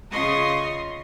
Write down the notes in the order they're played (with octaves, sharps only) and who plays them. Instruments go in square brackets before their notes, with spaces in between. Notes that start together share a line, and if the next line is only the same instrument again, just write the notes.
[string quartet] C#3 F4 D#5 C6 C#6 D#6